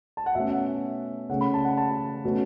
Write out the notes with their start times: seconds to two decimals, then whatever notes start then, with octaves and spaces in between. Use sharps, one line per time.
0.17 A5
0.26 F#5
0.35 B2 A3 C#4 E5
1.29 C#3 A3 C#4 F#5
1.41 B5
1.54 A5
1.65 F#5
1.77 A5
2.25 B2 A3 C#4